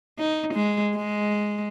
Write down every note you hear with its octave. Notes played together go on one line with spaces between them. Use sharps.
D#4
G#3
G#3